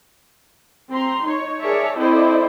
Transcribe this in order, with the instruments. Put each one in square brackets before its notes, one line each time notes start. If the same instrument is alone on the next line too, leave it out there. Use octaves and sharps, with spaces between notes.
[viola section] C4 A#5 C6
D#4 C#5
G#4 A#4 C#5 D5 E5 A5
C4 E4 A4 C5 D5 D#5